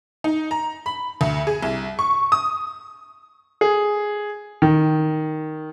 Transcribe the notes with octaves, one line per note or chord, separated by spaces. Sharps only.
D#4
A#5
B5
D2
G#4
C2
C#6
D#6
G#4
D#3